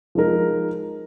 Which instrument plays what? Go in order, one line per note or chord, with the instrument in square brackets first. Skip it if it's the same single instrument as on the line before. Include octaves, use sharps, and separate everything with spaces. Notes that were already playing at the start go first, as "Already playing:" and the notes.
[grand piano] F3 G#3 D#4 A#4